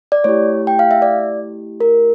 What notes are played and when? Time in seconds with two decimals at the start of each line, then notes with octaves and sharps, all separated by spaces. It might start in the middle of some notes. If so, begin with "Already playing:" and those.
0.12 D5
0.24 A3 E4 G4 C#5
0.67 G5
0.79 F5
0.91 E5
1.02 D5
1.80 A#4